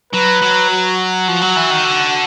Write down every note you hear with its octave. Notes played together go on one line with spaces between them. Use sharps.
F#3 B4
F#3
F#4
F3
F#3
E3
D#3
D3